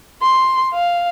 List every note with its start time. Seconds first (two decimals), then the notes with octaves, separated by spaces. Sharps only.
0.22 C6
0.74 F5